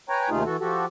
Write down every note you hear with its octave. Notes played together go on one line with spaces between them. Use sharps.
B4 C#5 G5 G#5 A#5
D#2 C3 A3 D#4 F4 G#4
E3 F#4 A4
F3 F#4 G4 A4